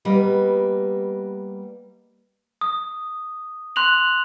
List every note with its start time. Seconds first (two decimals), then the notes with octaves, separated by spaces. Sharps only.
0.05 G3 A#3 B3 B4 D#5
2.61 D#6
3.76 C6 F#6 F7 F#7